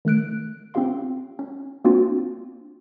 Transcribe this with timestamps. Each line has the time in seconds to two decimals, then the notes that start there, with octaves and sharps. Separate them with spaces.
0.05 D#3 A3 F#6 D7
0.74 C4 C#4 F4 G4 F5 C6
1.39 C#4
1.85 A#3 C4 D4 F4 F#4